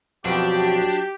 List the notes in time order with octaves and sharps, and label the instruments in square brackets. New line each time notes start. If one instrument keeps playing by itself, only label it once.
[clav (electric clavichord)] F2 B2 [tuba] F#3 [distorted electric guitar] D4 [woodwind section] G4